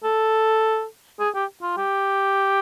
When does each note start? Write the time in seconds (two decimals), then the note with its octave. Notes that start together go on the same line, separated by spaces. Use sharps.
0.04 A4
1.19 G#4
1.35 G4
1.62 F4
1.77 G4